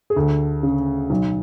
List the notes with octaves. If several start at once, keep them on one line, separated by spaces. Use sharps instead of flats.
G#4
D2 A4
C#3
B1